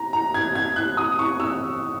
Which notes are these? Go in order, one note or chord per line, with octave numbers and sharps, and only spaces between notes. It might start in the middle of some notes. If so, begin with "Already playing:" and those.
Already playing: A#5
A#5
G#6
G#6
F#6
D#6
C#6
E6